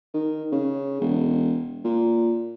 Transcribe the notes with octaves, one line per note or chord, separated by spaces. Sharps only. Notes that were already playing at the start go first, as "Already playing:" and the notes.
D#3
C#3
E1
A#2